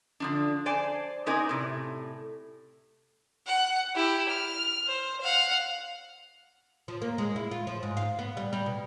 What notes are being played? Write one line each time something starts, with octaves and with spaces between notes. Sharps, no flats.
D3 F3 D4
C5 D5 G#5 A5
B3 C4 D#4 A#4 D5 G#5
A2 C3
F#5
E4 G4
F6
C5
F5 F#5
F3
A#3
G#3
E4
F4
F3
G#2
F5
B3
G3
G3
B2